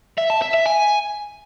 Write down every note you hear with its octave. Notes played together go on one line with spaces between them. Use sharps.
E5
A5
E5
E5
G#5